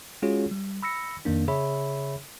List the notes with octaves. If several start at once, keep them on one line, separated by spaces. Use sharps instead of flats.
G#3 C#4 F4 F#4 G#4 C#5
G3
B5 E6 A#6 C#7
F2 D#3 A#3 D4
C#3 G#4 C#5 E5 B5